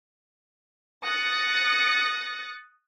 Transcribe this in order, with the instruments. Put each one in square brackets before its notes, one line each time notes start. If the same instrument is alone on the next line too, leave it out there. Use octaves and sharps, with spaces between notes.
[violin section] D#6 F#6 A6 A#6 C#7